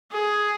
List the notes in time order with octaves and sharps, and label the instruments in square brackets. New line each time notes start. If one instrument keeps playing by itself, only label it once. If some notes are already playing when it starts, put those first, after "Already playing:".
[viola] G#4